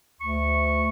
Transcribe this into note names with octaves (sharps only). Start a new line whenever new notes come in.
D2 C#6